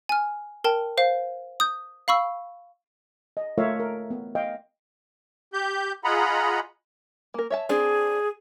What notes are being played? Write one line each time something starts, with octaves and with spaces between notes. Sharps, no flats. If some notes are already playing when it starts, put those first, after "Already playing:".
G#5 F6
A#4 G5 A5
C5 F5
D#6 G6
F5 B5 C#6 E6
D#5
A3 F4 A#4 C#5 E5 F5
A#4
B3
D#5 F5 G5
G4 G6
F4 G#4 D#5 F#5 A#5 B5
A#3 A#4
C#5 E5 A5
C4 D4 G#4